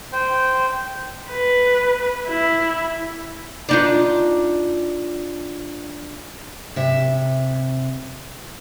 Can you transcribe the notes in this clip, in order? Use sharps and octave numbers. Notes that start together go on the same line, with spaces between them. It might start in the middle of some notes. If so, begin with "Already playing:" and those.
C5 G5
B4
E4
D4 D#4 F4
C3 E5